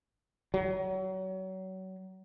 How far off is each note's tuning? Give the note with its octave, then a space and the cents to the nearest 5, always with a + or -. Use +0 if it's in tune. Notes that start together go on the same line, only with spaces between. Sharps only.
F#3 +30